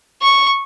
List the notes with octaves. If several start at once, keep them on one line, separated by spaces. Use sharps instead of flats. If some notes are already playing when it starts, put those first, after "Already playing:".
C#6